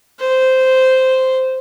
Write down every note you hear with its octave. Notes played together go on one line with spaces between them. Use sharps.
C5